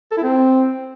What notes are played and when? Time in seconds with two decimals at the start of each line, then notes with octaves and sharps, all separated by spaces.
0.11 A4
0.17 E4
0.23 C4